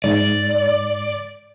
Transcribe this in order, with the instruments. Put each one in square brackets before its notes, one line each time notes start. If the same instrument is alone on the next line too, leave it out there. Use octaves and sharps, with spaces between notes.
[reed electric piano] G#2 [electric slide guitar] D5